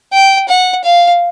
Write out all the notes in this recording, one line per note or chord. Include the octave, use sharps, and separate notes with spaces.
G5
F#5
F5